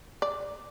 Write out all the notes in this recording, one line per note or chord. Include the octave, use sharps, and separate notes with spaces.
D5